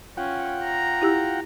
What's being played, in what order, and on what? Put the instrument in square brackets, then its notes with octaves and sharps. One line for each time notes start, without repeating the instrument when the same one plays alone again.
[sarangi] C#4 [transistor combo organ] F4 F#5 G5
[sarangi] A#5
[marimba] E4 G4 E6